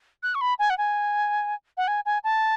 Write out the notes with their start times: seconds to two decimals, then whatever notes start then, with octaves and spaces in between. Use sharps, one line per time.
0.23 F#6
0.35 C#6
0.41 B5
0.59 G#5
0.70 F#5
0.78 G#5
1.77 F#5
1.88 G#5
2.06 G#5
2.24 A5